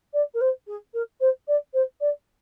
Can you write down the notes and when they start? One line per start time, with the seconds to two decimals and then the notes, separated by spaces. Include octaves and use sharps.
0.13 D5
0.34 A#4
0.41 C5
0.67 G#4
0.94 A#4
1.20 C5
1.48 D5
1.74 C5
2.00 D5